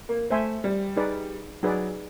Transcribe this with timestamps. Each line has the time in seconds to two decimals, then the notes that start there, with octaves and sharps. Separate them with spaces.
0.09 A#3
0.30 A3 C5 E5 G#5 C6
0.64 G3
0.97 D#4 G#4 B4 D5
1.63 F#3 D#4 G#4 B4 D5